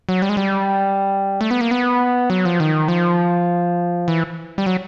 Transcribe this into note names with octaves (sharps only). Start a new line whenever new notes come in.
F#3
G3
G#3
G3
A3
B3
A#3
B3
F#3
F3
D#3
F3
E3
G3
F#3